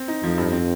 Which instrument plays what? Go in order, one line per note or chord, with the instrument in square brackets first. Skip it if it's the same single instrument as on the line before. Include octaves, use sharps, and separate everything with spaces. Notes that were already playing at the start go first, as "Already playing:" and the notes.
Already playing: [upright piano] C4
D#4
[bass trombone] F2 [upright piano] F3
[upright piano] G2
C4